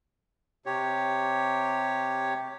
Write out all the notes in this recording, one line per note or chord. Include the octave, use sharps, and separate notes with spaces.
C3 G4 C#5